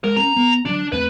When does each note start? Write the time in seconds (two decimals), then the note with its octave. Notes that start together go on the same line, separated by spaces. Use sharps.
0.04 G#3 A#4
0.17 C4 C#4 A#5
0.36 B3
0.65 D3 F#3 D4
0.92 E2 A3 C4 B4